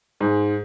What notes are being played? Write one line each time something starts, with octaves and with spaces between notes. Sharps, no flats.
G#2